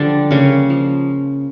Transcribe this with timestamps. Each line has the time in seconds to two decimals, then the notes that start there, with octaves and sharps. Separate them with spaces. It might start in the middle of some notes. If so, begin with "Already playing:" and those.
Already playing: D3 F3 G3 D4
0.31 C#3 A#3 C#4
0.70 F3